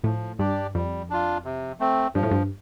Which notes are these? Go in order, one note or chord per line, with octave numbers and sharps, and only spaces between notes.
A2 F3
G2 D4 G4 D5
F2 G3
D4 F4
C3
A3 C4
G2 F3
A2
G2